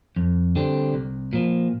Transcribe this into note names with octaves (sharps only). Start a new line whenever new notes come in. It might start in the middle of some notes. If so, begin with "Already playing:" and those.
F2
D3 G3 C4
C2
A#2 F3